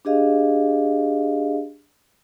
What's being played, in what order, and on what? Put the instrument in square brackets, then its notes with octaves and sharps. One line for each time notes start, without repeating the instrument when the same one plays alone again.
[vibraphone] D4 G4 G#4 D#5 F5